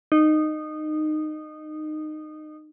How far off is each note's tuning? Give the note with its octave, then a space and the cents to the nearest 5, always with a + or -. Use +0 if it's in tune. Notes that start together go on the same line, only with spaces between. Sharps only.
D#4 -20